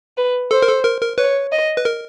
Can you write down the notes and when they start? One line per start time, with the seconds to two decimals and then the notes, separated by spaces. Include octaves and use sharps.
0.17 B4
0.51 A4 C5
0.63 A#4
0.68 A4
0.85 A#4
1.01 A#4
1.18 B4 C#5
1.52 D#5
1.77 B4
1.85 A#4